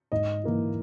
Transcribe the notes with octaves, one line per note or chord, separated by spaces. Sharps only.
G#2 D#5
E3 A#3 E4